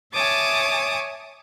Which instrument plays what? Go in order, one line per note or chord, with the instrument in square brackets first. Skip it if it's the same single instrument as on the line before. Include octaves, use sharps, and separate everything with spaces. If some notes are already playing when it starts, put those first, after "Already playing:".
[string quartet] C#5 E5 G#5 A5 D6 D#6